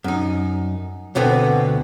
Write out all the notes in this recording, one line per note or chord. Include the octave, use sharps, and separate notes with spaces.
F#2 D#4
D2 B2 D3 B3 C4